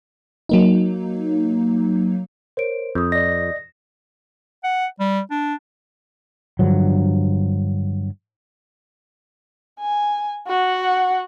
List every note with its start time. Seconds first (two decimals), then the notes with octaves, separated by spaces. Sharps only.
0.49 F#3 A#3 D#4
2.57 A#4 C5 C#5 D7
2.95 F2 D#6 G6
3.12 D5 D#5 A#6
4.64 F#5
5.00 G3
5.31 D4
6.59 G2 D3 F3 F#3
9.80 G#5
10.47 F#4 F#5